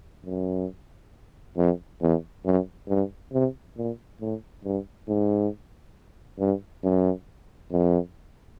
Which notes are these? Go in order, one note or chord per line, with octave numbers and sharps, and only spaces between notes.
F#2
F2
E2
F#2
G2
C3
A#2
A2
G2
G#2
G2
F#2
F2